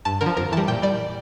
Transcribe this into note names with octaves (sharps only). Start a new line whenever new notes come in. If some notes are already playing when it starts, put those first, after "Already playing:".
G2 A5
D3 A#4
F3
F2 A#4
E3 G3 A5
A#2 G5
G3 D5